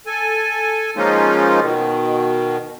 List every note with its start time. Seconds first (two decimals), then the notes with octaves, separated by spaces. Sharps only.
0.06 A4 G#5
0.96 F3 G#3 A#3 C#4 D#4 F4
1.61 B2 D#3